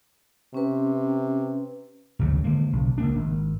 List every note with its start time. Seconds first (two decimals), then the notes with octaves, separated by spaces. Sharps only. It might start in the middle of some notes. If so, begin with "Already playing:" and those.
0.54 C3 C#4 B4
2.19 G#1 D2 C#3 F#3
2.44 D3 D#3 G#3 A#3
2.73 B1 C#3
2.98 C#2 A#3 D4
3.15 G#1